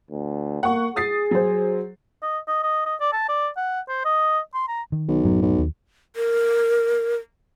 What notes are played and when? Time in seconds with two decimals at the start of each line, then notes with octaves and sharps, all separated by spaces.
0.11 D2
0.63 A#3 F#5 C#6
0.96 G#4 D#6 A6 C7
1.31 F#3 C5
2.23 D#5
2.48 D#5
2.64 D#5
2.86 D#5
3.01 D5
3.13 A5
3.29 D5
3.57 F#5
3.89 C5
4.05 D#5
4.54 C6
4.68 A#5
4.92 D#3
5.08 B1
5.24 F#2 A2 F#3
5.42 B1
5.58 D#2
6.16 A#4